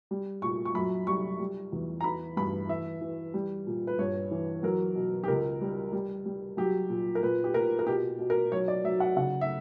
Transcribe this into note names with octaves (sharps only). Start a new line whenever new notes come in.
G3
A#2 C#6
C#6
F#2 B5
G3 C#6
G3
E2
A#5
E3 B5
G2 B5
E3 E5
E3
G3
A#2
B4
G2 C#5
E3
F#3 A#4
B2
G4
C#2 A#4
G3
G3
G3
F#3 G4
A#2
A#4
A#2 B4
G4
A#2 A#4
A#4
B2 G4
B2
A#4
F#3 C#5
D5
F#3 E5
F#5
C#3 F#5
E5